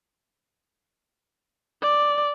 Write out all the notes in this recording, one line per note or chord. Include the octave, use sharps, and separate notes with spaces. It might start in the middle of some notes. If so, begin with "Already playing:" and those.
D5